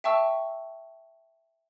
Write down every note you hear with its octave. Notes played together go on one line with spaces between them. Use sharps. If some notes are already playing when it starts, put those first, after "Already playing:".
E5 G5 A5 C#6 E6